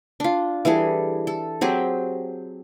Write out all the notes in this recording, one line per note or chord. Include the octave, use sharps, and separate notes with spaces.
D4 F4
E3 G3 G#4 A4
A4
F#3 C4 G4 G#4